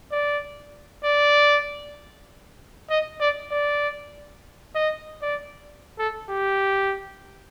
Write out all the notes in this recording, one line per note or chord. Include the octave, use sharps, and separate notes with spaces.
D5
D5
D#5
D5
D5
D#5
D5
A4
G4